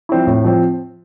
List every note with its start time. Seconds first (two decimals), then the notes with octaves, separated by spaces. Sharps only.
0.09 F3 C4 E4
0.27 A2
0.45 F3 C4